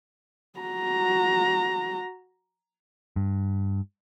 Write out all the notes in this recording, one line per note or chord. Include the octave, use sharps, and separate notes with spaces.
F#4 A#5
G2